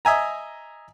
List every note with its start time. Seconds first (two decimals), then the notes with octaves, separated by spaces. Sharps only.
0.05 D#5 E5 G#5 A#5